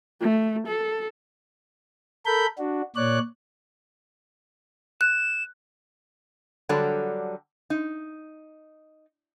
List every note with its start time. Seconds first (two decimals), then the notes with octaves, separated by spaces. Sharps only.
0.21 A3
0.67 A4
2.26 A4 A#4 B5 G6
2.58 D4 F#4
2.96 A#2 C#5 D5 F#6
5.01 F#6 E7
6.69 D3 F#3 G3 A4 D5
7.70 D#4